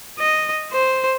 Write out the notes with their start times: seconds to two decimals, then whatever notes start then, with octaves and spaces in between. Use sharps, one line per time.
0.19 D#5
0.72 C5